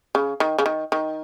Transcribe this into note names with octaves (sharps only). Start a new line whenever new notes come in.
C#3
D#3
C#3
D#3
D#3